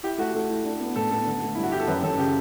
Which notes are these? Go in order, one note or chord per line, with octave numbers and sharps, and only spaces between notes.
E4 G4
A3 F#4
A3
E4
D4
B3
A2 A4
B3 A4
D3
A3
G2 E4
F#4
E4 G4
A4
F#2 B4
F#2 A4
C#3 G4